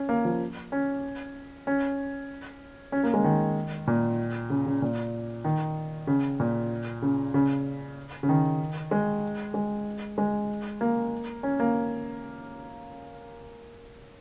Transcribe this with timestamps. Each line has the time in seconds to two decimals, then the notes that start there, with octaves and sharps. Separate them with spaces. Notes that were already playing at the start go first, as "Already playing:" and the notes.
Already playing: C#4
0.09 A#3
0.25 F3
0.72 C#4
1.67 C#4
2.92 C#4
3.03 A#3
3.14 G#3
3.24 D#3
3.87 A#2
4.50 C#3
4.66 C#3
4.82 A#2
5.45 D#3
6.07 C#3
6.40 A#2
7.02 C#3
7.34 C#3
8.23 C#3
8.29 D#3
8.91 G#3
9.54 G#3
10.18 G#3
10.81 A#3
11.43 C#4
11.60 A#3